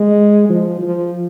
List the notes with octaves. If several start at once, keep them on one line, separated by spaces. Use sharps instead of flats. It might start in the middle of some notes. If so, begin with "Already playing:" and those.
Already playing: G#3
F3
F3